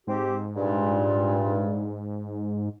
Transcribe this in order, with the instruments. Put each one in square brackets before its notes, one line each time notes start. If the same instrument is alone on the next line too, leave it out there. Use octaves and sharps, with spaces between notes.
[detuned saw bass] G#2 [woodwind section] C4 G4
[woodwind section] G2 A#2